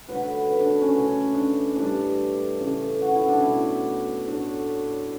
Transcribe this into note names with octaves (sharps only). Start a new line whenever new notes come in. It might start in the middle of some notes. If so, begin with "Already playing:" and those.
D3 F#3 A3 B4
B4
D4
C#4
C#3 E3 A3
D4
A2 E3 G3 D4
C#3 E3 A3
F#4
E4
D4
B2 F#3 A3 E4
A2 F#3 A3 D4